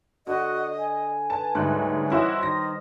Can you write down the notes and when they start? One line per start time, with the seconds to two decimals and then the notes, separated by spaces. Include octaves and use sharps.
0.27 D3 F#4 D#5
0.78 G#5
1.30 B4 A5
1.55 D2 G#2 G3 G#3 C#5 F#6
2.10 E3 C#4 E4 F#4 A#4 C5 D#5
2.43 D#3 A#6